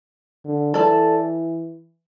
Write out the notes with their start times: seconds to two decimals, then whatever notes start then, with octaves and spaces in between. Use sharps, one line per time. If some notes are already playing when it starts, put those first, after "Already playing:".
0.45 D3
0.74 E3 A4 D5 A5